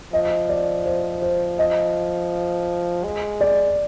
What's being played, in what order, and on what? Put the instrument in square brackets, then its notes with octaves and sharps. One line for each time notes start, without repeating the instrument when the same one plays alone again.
[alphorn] F3 [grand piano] D#5
[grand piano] D5
C5
C5
D#5
[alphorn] G#3
[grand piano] D5